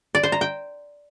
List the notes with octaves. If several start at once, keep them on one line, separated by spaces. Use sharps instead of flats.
D5
C5
A#5
G5